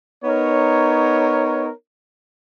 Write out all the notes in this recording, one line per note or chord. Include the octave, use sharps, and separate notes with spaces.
B3 D#4 A#4 C#5